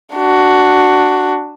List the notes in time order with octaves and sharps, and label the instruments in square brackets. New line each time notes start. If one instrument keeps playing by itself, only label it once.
[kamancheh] D4 F#4